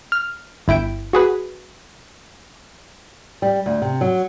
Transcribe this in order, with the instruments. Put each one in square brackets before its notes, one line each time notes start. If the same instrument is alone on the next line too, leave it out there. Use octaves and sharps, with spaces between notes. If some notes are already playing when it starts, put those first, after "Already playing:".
[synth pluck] F6
G1 E4 G5 D7
F#4 G#4 B4
[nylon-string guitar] G3
D2
C3
F#3